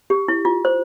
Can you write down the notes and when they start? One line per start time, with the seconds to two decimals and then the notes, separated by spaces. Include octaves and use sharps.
0.10 G4
0.28 E4
0.45 F4
0.65 C5